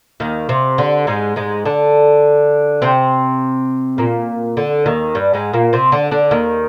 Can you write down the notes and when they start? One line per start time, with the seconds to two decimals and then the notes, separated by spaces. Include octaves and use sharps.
0.20 D#2 D#3
0.49 C3
0.78 D3
1.07 G#2 G#3
1.36 G#2 G#3
1.65 D3 D4
2.82 C3 C4
3.98 A#2 A#3
4.57 D3
4.86 D#2 D#3
5.15 G2 G3
5.34 G#2 G#3
5.53 A#2 A#3
5.73 C3 C4
5.92 D3 D4
6.11 D3 D4
6.31 D#2 D#3